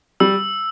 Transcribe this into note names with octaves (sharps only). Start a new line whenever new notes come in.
G3 E6